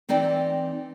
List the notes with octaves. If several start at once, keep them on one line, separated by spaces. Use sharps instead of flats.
E3 C4 D#4 D5 G5